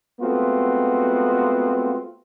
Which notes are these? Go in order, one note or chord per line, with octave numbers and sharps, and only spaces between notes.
G#3 A3 B3 C4 F4 F#4